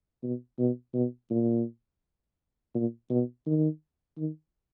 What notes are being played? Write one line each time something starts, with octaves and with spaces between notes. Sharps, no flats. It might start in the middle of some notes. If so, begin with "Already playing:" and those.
B2
B2
B2
A#2
A#2
B2
D#3
D#3